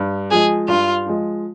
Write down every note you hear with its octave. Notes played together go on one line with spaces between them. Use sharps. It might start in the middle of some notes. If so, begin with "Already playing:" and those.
Already playing: G2
F3 G#3 G#4
G2 F4
F3 G#3